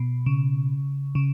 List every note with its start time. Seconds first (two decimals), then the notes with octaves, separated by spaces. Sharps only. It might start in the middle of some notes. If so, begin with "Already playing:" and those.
Already playing: B2
0.26 C#3
1.15 C#3